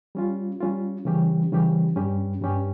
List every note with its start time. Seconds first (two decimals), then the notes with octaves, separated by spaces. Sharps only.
0.15 G3 C#4 F4
0.60 G3 C#4 F4
1.05 C#3 E3 G3 C#4 G4
1.52 C#3 E3 G3 C#4 G4
1.96 G2 G3 C#4 G4
2.42 G2 G3 C#4 G4